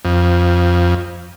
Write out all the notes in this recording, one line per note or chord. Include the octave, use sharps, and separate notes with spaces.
F2